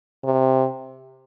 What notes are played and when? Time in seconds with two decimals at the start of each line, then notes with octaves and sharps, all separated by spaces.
0.25 C3